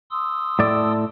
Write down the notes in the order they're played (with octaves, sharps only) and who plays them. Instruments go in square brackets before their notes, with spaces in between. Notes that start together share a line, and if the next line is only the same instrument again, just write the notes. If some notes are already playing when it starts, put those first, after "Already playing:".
[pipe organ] C6 D#6 E6
[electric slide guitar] A2 A4 D5